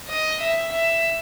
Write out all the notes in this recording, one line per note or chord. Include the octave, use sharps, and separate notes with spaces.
D#5
E5
E5